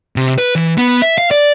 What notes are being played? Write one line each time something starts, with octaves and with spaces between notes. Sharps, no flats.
C3
B4
E3
B3
E5
F5
D5